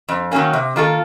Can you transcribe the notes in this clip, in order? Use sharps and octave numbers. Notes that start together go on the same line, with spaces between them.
F2
D#3 F#3 A#3 C#4
C3
D#3 A#3 F4 A4